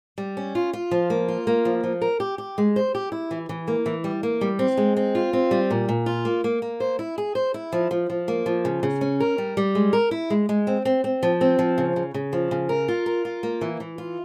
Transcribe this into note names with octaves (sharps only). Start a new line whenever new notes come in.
G3
C#4
F4
F4
F3
A#3
F4
A#3
F3
F3
A#4
G4
G4
G#3
C5
G4
E4
E3
E3
A#3
E3
G3
A#3
G3
C4
G#3
C4
F4
C4
G3
A#2
A#2
F4
A#3
A#3
A#3
C5
E4
G#4
C5
E4
F3
F3
F3
A#3
F3
C#3
C#3
C#4
A#4
G3
G3
G#3
A#4
E4
G#3
G#3
C4
C4
C4
F3
C4
F3
C#3
C#3
C#3
F3
C#3
A#4
F4
A#4
F4
A#3
E3
E3
F4